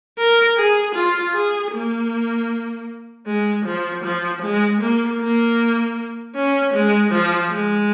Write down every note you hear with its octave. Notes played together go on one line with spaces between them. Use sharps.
A#4
G#4
F4
G#4
A#3
G#3
F3
F3
G#3
A#3
A#3
C#4
G#3
F3
G#3